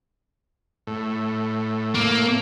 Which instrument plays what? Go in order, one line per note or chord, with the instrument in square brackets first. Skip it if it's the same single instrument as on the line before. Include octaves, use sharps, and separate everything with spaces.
[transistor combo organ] A2
[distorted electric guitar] A#3